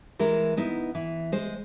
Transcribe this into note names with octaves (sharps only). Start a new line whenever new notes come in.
E3 G#3 A#4
B3 D#4 E4
E3
G#3 C5